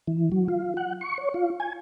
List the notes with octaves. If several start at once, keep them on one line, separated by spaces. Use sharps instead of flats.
E3
F#3
F4
F#5
C#6
C#5
F4
G#5